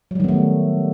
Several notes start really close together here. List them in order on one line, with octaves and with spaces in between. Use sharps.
F#3 G3 D#3 B3 A3